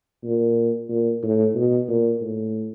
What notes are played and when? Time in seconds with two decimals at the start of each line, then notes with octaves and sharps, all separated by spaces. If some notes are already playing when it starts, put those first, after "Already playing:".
0.24 A#2
0.89 A#2
1.23 A2
1.55 B2
1.89 A#2
2.21 A2